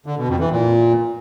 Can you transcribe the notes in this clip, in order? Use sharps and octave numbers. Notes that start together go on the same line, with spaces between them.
D3
B2
F2
E3
A#2